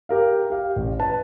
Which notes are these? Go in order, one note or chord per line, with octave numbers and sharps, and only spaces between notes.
G4 A#4 F5
G4 F5
A1
B4 A5